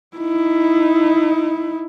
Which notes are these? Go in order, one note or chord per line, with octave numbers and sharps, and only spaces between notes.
D#4 E4